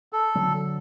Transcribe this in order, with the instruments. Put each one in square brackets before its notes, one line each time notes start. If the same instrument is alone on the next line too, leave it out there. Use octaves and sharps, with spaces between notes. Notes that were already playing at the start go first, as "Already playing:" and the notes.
[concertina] A4
[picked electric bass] D3 F#3